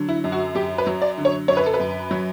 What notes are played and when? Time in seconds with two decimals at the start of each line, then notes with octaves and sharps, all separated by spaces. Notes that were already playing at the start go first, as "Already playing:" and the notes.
Already playing: D3 F#3
0.09 E4
0.24 F#2
0.32 F#4
0.55 F#2 G4
0.78 B4
0.87 F#3
1.02 D5
1.18 D3
1.25 C#5
1.48 F#2 C#5
1.57 B4
1.66 A4
1.74 B4
1.80 F#2
2.11 F#3